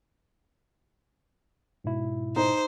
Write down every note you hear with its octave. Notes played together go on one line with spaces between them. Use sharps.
G#2 B2 E4
D#4 C5